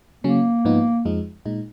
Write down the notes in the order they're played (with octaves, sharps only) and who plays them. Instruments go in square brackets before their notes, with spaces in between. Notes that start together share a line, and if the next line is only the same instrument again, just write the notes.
[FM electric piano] C#3 F#3 C#4 [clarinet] A#3
[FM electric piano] G#2 F3 B3 D#4
F2 F3 G#3 D#4
A#2 G#3 D#4